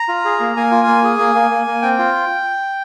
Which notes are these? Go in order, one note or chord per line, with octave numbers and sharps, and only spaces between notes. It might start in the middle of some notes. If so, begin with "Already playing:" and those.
Already playing: A#5
F4
G#4
A#3
A#3 G#5
F4
A#3
G#4
A#3
A#3
A#3
A#3
C4 G5
F4